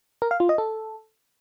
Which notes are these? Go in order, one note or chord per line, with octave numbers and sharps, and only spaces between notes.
A#4
F5
F4
D#5
A4